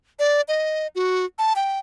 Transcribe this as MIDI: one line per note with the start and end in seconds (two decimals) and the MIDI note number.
0.19 0.41 74
0.48 0.87 75
0.95 1.25 66
1.39 1.53 81
1.56 1.79 79